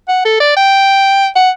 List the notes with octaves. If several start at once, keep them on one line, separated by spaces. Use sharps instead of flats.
F#5
A4
D5
G5
F#5